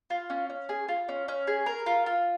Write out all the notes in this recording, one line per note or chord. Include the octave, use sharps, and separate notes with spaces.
F4
C#4
C#4
G#4
F4
C#4
C#4
G#4
A#4
F4
F4